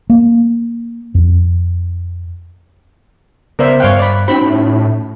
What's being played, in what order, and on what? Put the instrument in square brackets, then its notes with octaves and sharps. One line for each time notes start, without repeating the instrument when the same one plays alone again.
[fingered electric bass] A#3
F2
[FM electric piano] C#3 B3 D5 [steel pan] A#4 C5 E5
[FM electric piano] G2 F#6 [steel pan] C#5 F5 G5
[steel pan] D5 B5
[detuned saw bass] C4 [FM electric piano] C#4 D#4 F#4 [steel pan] B5
[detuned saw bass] A2